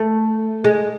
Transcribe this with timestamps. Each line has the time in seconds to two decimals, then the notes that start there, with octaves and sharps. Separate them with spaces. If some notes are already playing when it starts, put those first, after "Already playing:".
Already playing: A3
0.64 G#3